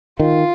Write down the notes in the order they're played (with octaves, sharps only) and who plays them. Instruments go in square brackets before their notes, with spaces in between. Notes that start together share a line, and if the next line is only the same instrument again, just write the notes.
[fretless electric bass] D#3 [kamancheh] F4